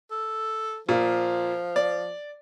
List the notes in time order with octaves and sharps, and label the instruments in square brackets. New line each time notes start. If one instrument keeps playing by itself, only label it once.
[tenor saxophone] A4
[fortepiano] A#2 [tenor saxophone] F3
[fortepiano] D5